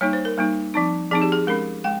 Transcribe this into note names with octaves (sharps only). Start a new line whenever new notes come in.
G3 A#3 D#4 C#5
C5
A#4
G3 A#3 D#4
F3 C4 D#4
F3 C4 D#4 G#4
G4
G#4
G#3 C#4 A#4
G#3 G5